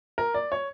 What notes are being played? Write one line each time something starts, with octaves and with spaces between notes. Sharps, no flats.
A#4
D5
C#5